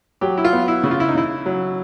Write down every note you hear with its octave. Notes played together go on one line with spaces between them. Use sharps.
F#3 G4
E4
F4
B3
E4
C#3
F4
E4
D#4
C#3 E4
F#3